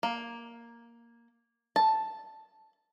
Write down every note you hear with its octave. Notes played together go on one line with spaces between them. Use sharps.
A#3
A5